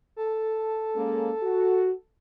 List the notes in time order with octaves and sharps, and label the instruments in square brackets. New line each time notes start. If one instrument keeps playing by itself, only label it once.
[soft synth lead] A4
[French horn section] G#3 A#3 C#4
F#4